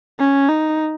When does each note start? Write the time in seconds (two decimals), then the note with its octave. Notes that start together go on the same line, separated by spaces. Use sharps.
0.19 C#4
0.49 D#4